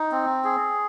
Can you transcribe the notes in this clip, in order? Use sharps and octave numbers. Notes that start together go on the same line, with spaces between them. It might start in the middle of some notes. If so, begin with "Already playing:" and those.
Already playing: D#4
C4
G#4